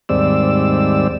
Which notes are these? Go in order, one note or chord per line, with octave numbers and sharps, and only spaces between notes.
D#2 G#2 G3 C4 D5 E6